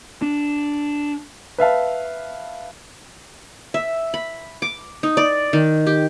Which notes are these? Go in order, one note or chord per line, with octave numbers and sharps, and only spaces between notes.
D4
B4 E5 F5 A5
E5
B5
D6
D#4
D5
D#3
G4